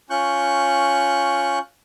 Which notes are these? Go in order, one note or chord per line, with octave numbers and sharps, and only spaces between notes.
C#4 F4 C#6 F#6 G6